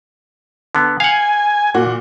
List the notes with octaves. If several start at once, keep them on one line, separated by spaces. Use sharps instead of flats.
D3 B3
F5 F#5 G#5
A#2 F#4